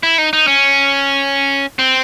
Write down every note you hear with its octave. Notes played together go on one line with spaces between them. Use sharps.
E4
D#4
D#4
C#4
C4